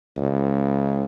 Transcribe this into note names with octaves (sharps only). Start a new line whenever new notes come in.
C#2